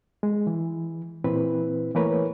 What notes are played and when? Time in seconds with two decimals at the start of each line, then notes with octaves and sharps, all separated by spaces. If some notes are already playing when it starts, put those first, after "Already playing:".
0.23 G#3
0.47 E3
1.24 A#2 E3 C4 E4 B4
1.95 E3 A3 A#3 A#4 B4 C#5